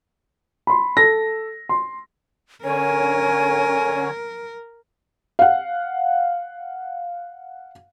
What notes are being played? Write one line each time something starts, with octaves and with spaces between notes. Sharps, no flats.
B5 C6
A4 A#6
C6
D3 C#4 A#4 C#5 G#5
F5 F#5